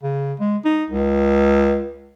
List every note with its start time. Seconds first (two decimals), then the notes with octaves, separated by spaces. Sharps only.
0.03 C#3
0.40 G#3
0.65 D#4
0.90 C#2